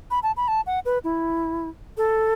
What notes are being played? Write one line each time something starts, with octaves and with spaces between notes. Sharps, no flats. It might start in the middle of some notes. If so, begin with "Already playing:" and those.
B5
A5
B5
A5
F#5
B4
E4
A4